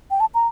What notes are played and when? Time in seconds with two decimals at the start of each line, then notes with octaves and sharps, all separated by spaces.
0.11 G5
0.20 A5
0.34 A#5